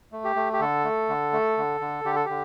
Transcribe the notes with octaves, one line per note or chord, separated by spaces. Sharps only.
A3
G4
A3
G4
D3 A4
A3
D3
A3
D3
D3
D3 G4
A4
D3 G4